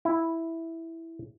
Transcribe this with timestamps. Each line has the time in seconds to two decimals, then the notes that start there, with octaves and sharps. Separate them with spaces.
0.05 E4